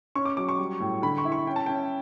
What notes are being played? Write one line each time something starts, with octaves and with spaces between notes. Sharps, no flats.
C#4 C#6
D6
F#3 D6
C#6
G3
A2
D3 B5
C#6
E4
C#6
C#4 G5
A5
C#4 G5